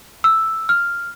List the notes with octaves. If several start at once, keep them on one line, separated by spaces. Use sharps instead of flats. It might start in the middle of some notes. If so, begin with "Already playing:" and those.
E6
F6